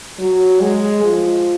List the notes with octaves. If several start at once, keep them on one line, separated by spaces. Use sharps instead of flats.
F#3
G#3
F3